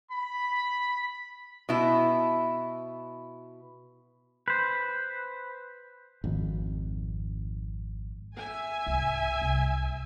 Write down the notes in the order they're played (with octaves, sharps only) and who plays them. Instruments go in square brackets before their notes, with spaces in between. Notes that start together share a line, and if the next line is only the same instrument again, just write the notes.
[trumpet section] B5
[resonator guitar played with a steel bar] B2 E4
[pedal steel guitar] B4 C5
[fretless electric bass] G#1 F2
[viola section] E5 G#5
[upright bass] C2 G#2
C2